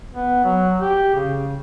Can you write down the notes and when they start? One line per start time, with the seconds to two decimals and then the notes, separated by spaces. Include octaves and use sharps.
0.12 B3
0.44 F#3
0.80 G4
1.15 C#3